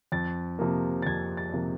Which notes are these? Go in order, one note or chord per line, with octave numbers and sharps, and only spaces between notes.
F2 A6
C3 F3 A#3
A6
F2 G#6
A6
C3 F3 A#3